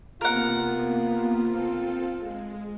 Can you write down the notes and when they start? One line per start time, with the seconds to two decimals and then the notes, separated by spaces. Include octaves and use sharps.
0.21 C3 A#3 B3 F4 A#4 F#5
1.45 C4 A4
2.17 G#3